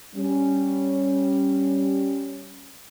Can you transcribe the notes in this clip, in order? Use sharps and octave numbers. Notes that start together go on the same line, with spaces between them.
G3 C#4